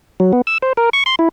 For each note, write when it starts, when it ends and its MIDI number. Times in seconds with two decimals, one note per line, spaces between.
0.20 0.32 54
0.33 0.41 59
0.47 0.58 88
0.62 0.73 72
0.77 0.89 70
0.93 1.03 85
1.06 1.15 84
1.19 1.29 64